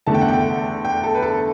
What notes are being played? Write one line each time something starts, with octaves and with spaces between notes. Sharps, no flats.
E2 D3 A3 A5
G5
F#5
G5
G5
A4
B4
A4